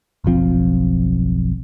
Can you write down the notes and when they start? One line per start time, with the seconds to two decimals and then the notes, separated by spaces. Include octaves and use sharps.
0.24 F#1 B1 F3 C4